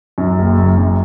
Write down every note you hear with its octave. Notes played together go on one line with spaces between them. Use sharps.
F#2
F#1
F#1
F#2